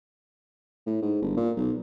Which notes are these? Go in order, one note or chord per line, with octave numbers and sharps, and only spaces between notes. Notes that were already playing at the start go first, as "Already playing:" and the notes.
A2
G#2
G1
A#2
B1